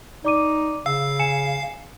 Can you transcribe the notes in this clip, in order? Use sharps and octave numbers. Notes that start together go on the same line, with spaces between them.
D#4 D5 D6 D#7
C#3 F5 E6
G#5 C#7 E7